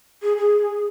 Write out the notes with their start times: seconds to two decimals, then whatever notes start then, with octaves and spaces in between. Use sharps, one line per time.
0.22 G#4
0.38 G#4